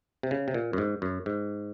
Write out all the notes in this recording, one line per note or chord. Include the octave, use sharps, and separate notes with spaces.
C3
C#3
C3
A#2
F#2
G#2
F#2
G#2